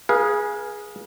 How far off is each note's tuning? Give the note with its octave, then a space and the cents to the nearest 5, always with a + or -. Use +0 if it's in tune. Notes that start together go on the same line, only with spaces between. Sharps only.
G#4 +0 B4 -45 F5 +0